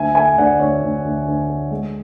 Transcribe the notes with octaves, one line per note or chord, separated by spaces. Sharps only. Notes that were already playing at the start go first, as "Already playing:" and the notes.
Already playing: D2 E5 G#5
A3 E5 G#5
D2 D5 F#5
D2 C#5
D2
D2
D2
A3
G#3